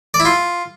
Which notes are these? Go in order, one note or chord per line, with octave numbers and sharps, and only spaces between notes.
D5
E4
F4